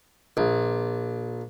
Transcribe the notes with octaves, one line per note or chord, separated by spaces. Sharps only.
A#1